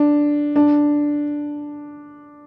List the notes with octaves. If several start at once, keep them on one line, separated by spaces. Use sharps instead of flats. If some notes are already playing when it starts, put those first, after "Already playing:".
Already playing: D4
D4